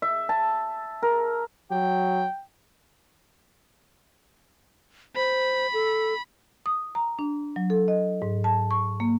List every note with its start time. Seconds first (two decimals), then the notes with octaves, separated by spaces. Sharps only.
0.02 E5
0.29 A5
1.03 A#4
1.71 F#3 G5
5.16 C5 B5
5.74 A4
6.66 D#6
6.95 A#5
7.19 D4
7.56 F#3
7.70 A4
7.88 D#5
8.22 G#2
8.44 A5
8.71 C#6
9.00 A#3